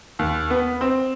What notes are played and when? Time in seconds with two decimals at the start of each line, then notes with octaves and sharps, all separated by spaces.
0.19 D#2
0.50 B3
0.81 C4